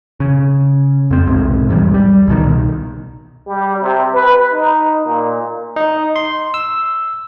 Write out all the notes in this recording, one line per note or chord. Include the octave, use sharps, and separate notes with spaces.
C#3
F2 C4
B1 G#2 C3
E2 G#2 F3 G3
G3
C2 B2 D#3
G3
C3
B4
D#4
A#2
D#4
C6
E6